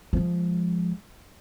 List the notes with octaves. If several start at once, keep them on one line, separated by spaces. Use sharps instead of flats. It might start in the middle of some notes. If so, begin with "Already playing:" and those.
F3 G#3